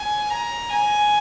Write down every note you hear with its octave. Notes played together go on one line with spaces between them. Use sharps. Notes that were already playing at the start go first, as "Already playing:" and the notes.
Already playing: G#5
A#5
G#5